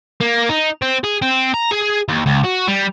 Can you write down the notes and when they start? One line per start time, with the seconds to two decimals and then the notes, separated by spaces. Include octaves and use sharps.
0.21 A#3
0.49 D#4
0.82 C4
1.04 G#4
1.22 C4
1.54 A#5
1.71 G#4
2.08 D#2
2.26 C#2
2.45 F#4
2.68 G3